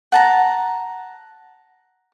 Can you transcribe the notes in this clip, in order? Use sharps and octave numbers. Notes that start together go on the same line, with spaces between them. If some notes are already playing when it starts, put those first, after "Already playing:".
F#5 A5 A#5